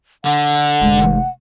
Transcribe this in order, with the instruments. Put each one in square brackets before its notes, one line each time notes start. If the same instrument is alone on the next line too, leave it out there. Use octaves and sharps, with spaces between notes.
[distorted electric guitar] D3 [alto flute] F#5
[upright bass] F1 G#3